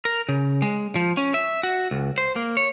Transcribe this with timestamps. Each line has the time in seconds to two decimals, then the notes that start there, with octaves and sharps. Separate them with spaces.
0.05 A#4
0.29 C#3
0.62 G#3
0.96 F3
1.17 C#4
1.34 E5
1.63 F#4
1.91 C#2
2.18 C5
2.36 A#3
2.57 C#5